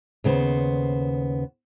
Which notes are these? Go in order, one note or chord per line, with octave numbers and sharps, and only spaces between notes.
D#2 C#3 B3 C5